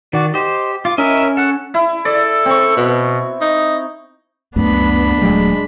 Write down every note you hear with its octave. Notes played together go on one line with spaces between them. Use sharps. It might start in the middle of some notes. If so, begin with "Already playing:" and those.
D#3 F#4 D5
G4 C5 D#5
F4 D6
C#4 E4 A#4 D#5 E5
A4 F#5
E4
A4 D5
C4 C#6
B2
D#4
C#2 F#2 A3 B3 D4 B5
D#1 F#3 G#3 A3